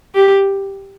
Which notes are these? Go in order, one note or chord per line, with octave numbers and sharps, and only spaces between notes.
G4